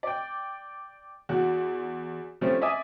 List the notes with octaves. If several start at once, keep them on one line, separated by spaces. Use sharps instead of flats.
D5 G5
E2 F#4
F3 G3 A3 C4 C#4
D5 E5 G#5 D#6